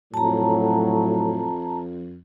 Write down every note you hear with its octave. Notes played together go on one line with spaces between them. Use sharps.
F2 A2 F#3 A5 A#5